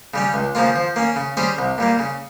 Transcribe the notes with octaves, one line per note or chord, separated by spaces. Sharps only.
C#3 G3 C#4
C#2
C#3 F3 A#3 F4
F3
A#3 C#4
C#3
G3 C#4 G#4 C5
C2
A#2 G3 A#3
C#3